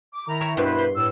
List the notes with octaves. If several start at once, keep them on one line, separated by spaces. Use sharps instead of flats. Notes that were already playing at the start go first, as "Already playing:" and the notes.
D6
D#3 E4 A#5
A#4 C#5 E5
G2 B2 E4 B4 C5
C6
A2 E6